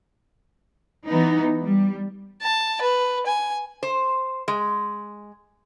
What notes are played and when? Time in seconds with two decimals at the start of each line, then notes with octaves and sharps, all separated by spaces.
1.06 E3 B3 D#4
1.63 G3
2.42 A5
2.81 B4
3.26 G#5
3.83 C5
4.48 G#3